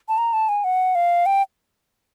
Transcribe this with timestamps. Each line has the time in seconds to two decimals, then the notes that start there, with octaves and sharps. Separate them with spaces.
0.09 A5
0.18 A#5
0.33 A5
0.49 G#5
0.64 F#5
0.95 F5
1.26 G5